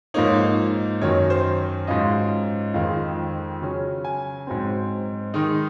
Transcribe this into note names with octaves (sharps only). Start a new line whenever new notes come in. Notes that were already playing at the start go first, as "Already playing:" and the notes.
G#2 F3 A#3 D#4 C#5
F#2 D#3 F#3 C#5
C5
G#2 F#3 C#4 F4 D#5
F2 D#3 G#3 F5
C#3 F#3 C#4
G#5
G#2 F#3 C4
D#3 G#3 D#4